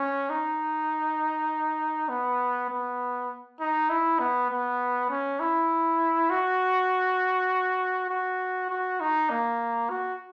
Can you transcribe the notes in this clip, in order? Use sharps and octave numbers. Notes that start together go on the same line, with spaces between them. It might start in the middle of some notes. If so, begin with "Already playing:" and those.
Already playing: C#4
D#4
B3
B3
D#4
E4
B3
B3
C#4
E4
F#4
F#4
F#4
D#4
A#3
F#4